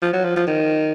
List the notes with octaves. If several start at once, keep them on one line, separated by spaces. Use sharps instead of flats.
F3
F#3
F3
F3
D#3